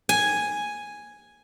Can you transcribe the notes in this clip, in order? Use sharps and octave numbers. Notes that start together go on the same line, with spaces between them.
G#5